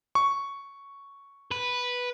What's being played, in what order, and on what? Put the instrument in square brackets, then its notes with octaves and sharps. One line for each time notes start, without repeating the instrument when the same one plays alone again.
[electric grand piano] C#6
[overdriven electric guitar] B4